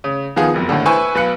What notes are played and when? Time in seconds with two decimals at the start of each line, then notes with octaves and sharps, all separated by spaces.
0.04 C#3
0.36 D#3 F3 B3 F4 G#4
0.54 F#1 B1 F2
0.69 D#2 A2 D3
0.85 E4 B4 C5 G#5 C#6 E6
1.15 B1 B4 F5 F#6 C#7